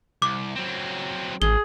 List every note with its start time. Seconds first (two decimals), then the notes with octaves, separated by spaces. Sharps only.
0.22 C2 D6
0.55 F#3 C4
1.42 A1 G#4 G7